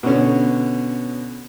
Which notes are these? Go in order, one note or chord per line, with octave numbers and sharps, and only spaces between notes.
B2 D3 C#4